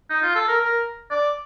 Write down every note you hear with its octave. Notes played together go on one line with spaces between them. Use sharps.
D#4
F4
A4
A#4
A#4
D5